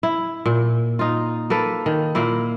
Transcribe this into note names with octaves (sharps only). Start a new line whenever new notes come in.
E4
A#2
D#4 F4
A#3 A4 B4
D#3
A#2 A#3 E4